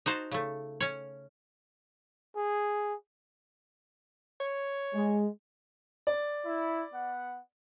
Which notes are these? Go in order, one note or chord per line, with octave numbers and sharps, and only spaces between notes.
D#4 F#4 C5 A5
C#3 A3
C#4 C#5
G#4
C#5
G#3
D5
E4
B3 F#5